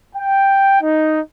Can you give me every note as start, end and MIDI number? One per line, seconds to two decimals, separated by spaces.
0.16 0.79 79
0.81 1.20 63